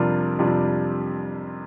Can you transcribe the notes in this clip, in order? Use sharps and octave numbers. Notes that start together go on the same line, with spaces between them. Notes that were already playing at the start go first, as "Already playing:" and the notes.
Already playing: F2 C3 G3 D4 F4 A#4
F2 C3 G3 D4 F4